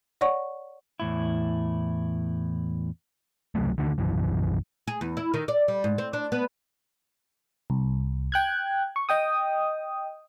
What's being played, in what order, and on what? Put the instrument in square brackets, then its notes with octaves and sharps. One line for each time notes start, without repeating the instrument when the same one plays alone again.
[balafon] C#5 D5 F#5 C#6
[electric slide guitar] E2 A2 E4
[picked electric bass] C#2 C3 F#3 A3
D2 D3 D#3 D4
F#1 B1 F#2 E3
[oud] G#4
E2
E4
D#3
D5
G3
G#2
C4
D4
B3
[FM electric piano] C2
G5 F#6 G#6
C#6
D#5 G5 D#6